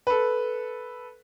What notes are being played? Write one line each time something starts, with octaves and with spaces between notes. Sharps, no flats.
A4 B4